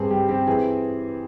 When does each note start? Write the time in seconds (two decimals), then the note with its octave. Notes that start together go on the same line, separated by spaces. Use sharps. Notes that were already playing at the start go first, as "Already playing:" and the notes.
Already playing: G2 C4 G#4
0.11 G3 G4
0.29 C4 G4
0.47 E3 G#4